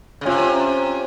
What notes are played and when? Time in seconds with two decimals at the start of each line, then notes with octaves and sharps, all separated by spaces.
0.21 C#3
0.25 C3 C#4 F4